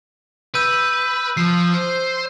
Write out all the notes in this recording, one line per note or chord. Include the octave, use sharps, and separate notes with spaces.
B4 E6 G6 D#7
F3 C7
C5